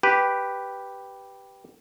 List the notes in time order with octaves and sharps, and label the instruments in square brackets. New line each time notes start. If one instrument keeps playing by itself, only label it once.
[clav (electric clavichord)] G4 B4